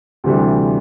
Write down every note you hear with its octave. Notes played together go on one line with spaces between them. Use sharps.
D2 C3 E3 G3